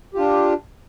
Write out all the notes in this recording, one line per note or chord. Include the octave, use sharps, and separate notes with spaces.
D4 F4 G4